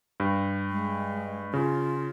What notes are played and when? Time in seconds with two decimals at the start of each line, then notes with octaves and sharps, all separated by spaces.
0.20 G2
0.70 G#3
1.53 C#3 F4